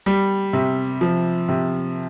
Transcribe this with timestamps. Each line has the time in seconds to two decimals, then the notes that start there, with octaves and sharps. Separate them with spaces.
0.06 G3
0.53 C3
1.01 F3
1.49 C3